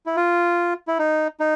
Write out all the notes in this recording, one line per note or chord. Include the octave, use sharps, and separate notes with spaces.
E4
F4
E4
D#4
D#4